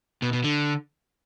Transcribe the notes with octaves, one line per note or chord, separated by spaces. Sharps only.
B2
B2
D3